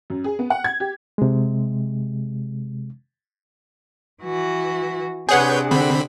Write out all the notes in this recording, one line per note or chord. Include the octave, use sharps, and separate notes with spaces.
F#2
G#4
B3
F#5
G#6
G4
C3 G#3
E3 F#4
C3 D4 G#4 B4 C#5 F#5 G6
D3 C4 B5